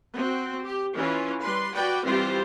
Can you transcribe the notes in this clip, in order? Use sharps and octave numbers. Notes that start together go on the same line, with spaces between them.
C4 F#4
G4
E3 C#4 F4
G3 B4 C6
F#4 B4 D5 G5
E3 G3 C4 F4 G4 C5